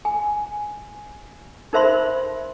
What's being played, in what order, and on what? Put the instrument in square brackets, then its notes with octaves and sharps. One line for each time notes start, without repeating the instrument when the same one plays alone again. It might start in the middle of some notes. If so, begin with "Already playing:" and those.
[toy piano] G#5
D#4 A#4 C5 E5 B5 C6